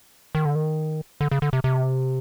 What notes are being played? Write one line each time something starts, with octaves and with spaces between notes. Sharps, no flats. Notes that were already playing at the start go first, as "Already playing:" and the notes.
D#3
D3
D#3
D3
C#3
D3
C3
C3